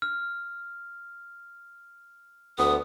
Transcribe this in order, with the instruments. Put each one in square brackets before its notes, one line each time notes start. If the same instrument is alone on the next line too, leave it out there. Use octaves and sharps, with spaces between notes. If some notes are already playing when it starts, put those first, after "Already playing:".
[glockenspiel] F6
[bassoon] D2 [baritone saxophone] B3 [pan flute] D#6